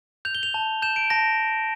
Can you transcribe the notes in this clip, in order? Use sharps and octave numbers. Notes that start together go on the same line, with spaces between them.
G6 F7
G7
F7
A5
G6 E7
D7
A5 A#6